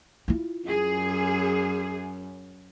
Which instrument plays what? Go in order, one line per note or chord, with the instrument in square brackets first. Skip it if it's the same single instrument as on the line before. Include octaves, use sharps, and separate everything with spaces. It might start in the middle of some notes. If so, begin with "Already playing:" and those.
[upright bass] E4 F4
[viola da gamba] F#2 [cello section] G#4